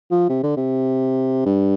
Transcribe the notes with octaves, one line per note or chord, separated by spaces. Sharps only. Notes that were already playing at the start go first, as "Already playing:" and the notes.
F3
C3
D3
C3
G2